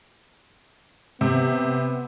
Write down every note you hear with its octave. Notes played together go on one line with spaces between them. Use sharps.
C3 B3